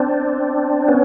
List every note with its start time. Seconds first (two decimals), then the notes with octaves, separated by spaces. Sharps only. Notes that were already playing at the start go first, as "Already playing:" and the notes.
Already playing: C4 D4
0.88 B3 C#4